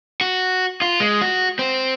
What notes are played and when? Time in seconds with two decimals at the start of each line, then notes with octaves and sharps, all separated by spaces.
0.21 F#4
0.82 F4
1.00 G#3
1.21 F#4
1.59 C4